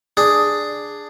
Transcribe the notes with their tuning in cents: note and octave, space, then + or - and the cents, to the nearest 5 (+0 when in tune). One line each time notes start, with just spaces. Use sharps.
D4 +5 G#4 +0